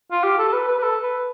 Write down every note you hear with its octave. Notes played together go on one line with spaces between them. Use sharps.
F4
G4
A4
A4
B4
B4
B4
A4
B4